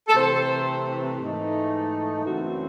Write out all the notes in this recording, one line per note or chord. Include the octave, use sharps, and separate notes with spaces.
A4
C3 E3 A3 C4 C5
G#2 E3 A3 D#4
F#2 C#3 E3 A3 C4 F#4